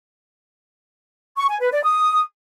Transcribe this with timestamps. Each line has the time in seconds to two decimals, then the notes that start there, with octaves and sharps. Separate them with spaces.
1.38 C#6
1.49 G#5
1.61 B4
1.73 D5
1.85 D#6